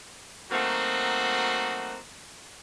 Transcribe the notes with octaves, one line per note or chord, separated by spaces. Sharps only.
F#3 A3 A#3 C4 D#4 F#4